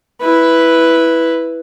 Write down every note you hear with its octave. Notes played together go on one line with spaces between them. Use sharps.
E4 B4